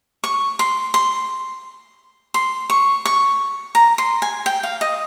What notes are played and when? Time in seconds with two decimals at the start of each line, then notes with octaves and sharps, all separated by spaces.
0.24 C#6
0.59 C6
0.94 C6
2.34 C6
2.70 C#6
3.05 C#6
3.75 A#5
3.98 C6
4.22 G#5
4.46 G5
4.63 F5
4.81 D#5